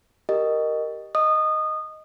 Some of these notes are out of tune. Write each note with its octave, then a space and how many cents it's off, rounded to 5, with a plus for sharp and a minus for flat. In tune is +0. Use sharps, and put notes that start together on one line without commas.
G4 +0 A#4 +0 D#5 -10
D#5 +0 D#6 -20